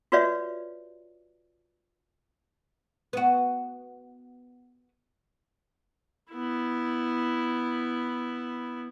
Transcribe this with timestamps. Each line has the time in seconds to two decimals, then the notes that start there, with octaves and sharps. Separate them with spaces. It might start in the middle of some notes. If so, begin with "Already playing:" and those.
0.12 F4 F#4 B4 C#5 D5 E5
3.13 B3 F#4
6.33 B3 E4